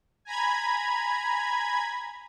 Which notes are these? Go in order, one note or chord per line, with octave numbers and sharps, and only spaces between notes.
G#5 A#5 B5 G#6